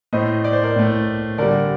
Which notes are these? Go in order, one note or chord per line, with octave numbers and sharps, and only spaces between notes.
A2 A3 C5 D#5
D5
C5
A#4 D5
A2 A3
D3 G3 A#4 D5